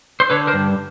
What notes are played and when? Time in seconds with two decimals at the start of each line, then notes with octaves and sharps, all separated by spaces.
0.20 C5
0.30 D3 B4 C#5
0.47 A#4 C5
0.53 G2